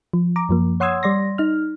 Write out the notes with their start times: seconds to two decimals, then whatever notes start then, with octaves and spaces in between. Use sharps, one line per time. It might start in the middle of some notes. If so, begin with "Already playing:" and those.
0.13 F3
0.36 A#5 D6
0.49 F#2 F3 A#3
0.80 C#5 F#5 C6 D#6 E6 G#6
1.03 G3 D5 C6 A#6
1.38 D#4 F6